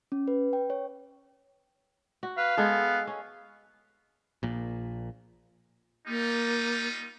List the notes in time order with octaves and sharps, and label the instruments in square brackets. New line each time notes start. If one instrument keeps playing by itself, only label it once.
[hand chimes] C#4
B4
G5
C#5
[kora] F#4
[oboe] B4 [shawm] F5
[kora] G#3 G#4 A4 [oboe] B3
[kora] C#4
[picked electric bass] A#1 A#2
[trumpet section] G3 D#4 F4 [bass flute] A#3